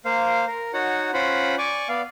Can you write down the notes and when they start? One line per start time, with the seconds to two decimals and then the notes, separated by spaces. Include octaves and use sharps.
0.05 A#3 C5 F5
0.47 A#4
0.74 D#4 F#4 C#5 F#5
1.14 C#4 F4 C5 F#5 B5
1.58 D5 G#5 C#6 D6
1.89 B3 D5 F5